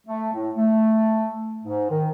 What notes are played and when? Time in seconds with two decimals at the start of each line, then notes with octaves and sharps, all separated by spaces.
0.07 A3
0.33 A2
0.56 A3
1.64 G#2
1.91 D#3